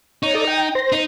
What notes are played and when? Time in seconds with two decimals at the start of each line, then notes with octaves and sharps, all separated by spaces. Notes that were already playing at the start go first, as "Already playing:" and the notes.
0.23 D#4 C#5
0.34 A4 D5 D#5
0.47 G5
0.75 C5 C6 A#6
0.92 D#4